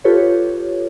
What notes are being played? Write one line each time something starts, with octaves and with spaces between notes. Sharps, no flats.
F4 G4 A4 B4 C#5